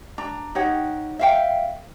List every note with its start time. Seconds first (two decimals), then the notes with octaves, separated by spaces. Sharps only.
0.18 D4 A#5
0.55 D#4 G4 C#5 F#5
1.19 E5 F5 G5